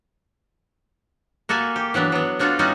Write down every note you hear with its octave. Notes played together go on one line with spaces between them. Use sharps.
A#3 F#4 A4 E5 G#5
G4
E3 F#3 B3 D4
F#3 B3
A3 D4 F4 F#4 A4
G3 C#4 D#4 F4 F#4